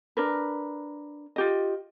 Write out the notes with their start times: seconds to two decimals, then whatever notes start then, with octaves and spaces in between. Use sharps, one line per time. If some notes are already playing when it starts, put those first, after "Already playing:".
0.17 D4 A#4 B4
1.36 F4 G4 D#5